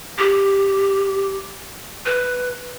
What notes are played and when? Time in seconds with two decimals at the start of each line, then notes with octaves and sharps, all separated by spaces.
0.18 G4
2.06 B4